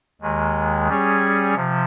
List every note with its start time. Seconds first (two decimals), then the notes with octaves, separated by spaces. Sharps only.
0.21 D#2 D#3 G#3
0.88 G3 C#4 G#4 C#5
1.55 C3 F3